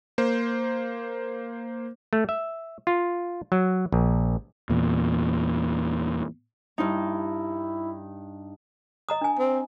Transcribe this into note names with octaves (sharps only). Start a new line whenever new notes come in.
A#3 C5
A3
E5
F4
F#3
A#1
E2 A#2
G2 D#4 E4
D#5 A#5 D#6
D4 G#5
C4